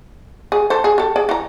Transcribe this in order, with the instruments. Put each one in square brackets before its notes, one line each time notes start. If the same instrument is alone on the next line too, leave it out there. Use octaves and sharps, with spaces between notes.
[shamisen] G#4
A4 C5
G#4
G4 A4
G#4 D5
E3 A#5